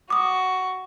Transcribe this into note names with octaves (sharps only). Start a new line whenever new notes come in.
F#4 D6 D#6